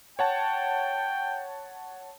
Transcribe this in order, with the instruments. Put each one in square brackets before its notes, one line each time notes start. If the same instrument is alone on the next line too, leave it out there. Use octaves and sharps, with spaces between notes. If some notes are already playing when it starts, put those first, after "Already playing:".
[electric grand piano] C#5 F#5 A5 [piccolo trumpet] G5